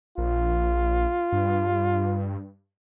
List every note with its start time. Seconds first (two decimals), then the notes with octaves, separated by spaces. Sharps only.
0.18 A#1 F4
1.32 G2